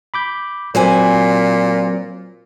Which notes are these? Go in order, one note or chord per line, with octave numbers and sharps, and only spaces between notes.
B5 D6 G6
A#2 F#3 C4 B4 C5 G#5